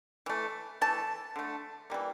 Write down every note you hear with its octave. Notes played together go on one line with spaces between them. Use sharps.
E3 A3
E3 A3 A5
D3 A3
E3 G3 A#3